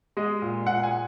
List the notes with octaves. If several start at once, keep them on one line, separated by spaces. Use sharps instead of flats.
G#3 D#5
A#2
A#2 F#5
G#5